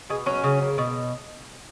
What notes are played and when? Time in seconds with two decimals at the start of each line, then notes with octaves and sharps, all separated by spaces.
0.10 B2 G#4
0.26 F#3 C#4
0.44 C#3
0.61 A#3
0.78 B2